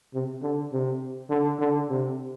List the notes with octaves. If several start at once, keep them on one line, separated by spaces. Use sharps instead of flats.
C3
D3
C3
D3
D3
C3